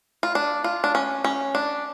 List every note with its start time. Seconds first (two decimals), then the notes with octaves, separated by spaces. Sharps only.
0.23 F4
0.35 D4
0.64 F4
0.84 D4
0.95 C#4
1.24 C#4
1.55 D4